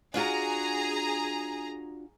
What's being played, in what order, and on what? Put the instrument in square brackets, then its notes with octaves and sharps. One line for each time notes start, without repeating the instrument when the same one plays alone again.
[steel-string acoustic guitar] D4 F4 F#4 [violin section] G#4 A#5